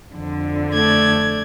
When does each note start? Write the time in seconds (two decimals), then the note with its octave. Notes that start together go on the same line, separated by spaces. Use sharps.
0.14 F2 D3
0.73 A3 D5 G#6